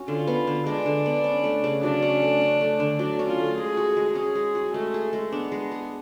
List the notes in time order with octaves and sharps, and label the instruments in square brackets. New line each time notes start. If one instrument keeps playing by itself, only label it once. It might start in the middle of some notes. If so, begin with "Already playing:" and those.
Already playing: [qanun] C#4 F#4
[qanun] D3 [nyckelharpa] F4
[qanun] B3
D3
[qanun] G#3 [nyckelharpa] D4
[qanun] D3
B3
C#4
A3
C#3
[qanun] F#3 [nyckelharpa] D4
[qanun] C#4
A3
C#4
A3
D3
[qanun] F#3 [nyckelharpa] D4
[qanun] C#4
[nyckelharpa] F4
[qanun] A3
[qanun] G#3 [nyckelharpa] G#4
[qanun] F#4
G#3
[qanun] C#4 [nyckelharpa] G#4
[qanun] G#3
F#4
[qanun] G#3 [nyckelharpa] A3
[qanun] G#4
G#3
[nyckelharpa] B3 [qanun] D4
[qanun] G#3
G#4